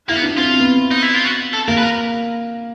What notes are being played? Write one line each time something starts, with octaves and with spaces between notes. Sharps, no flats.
A#3 E4
B3
D4
C4 F4
B3
D#4
E4
F4
F#4
A4
A#3 A#4
B4
A#4